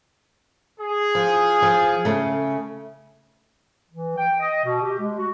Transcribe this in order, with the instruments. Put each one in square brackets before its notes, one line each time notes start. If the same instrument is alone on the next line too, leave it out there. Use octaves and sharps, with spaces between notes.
[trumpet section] G#4
[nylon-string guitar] F3
F3
C#3 A3
[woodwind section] E3
G5
D#5
B2
G4
G#3
F#4